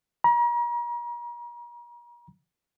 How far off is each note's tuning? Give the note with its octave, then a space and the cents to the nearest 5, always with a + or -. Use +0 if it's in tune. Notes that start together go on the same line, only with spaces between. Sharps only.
A#5 +40